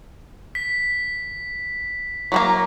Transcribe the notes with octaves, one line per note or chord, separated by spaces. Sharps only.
B6
F#3 G3 A#3